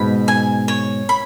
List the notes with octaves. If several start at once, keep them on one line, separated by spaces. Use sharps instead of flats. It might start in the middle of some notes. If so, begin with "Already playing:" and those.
Already playing: G#2 B2 B5
G#5
C#5
B5